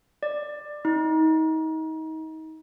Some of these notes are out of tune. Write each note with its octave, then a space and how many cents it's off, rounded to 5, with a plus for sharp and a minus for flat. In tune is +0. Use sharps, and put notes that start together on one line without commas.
D5 +15
D#4 +30